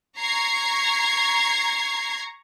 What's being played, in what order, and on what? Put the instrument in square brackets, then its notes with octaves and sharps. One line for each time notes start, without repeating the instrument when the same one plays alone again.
[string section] A#5 C#6 G#6 C7